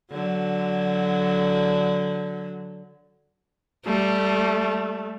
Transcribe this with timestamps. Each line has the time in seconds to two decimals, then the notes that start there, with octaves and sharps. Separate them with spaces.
0.12 D3 F#3
3.86 G3 A3